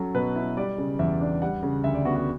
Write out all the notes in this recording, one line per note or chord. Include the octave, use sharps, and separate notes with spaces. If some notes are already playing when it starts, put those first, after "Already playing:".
Already playing: F#3 C#4 A4
B2 B4
E4
G3 D5
C#3
E2 E5
D4
G3 F#5
C#3
D2 E5
D5
B3 F#4
F#4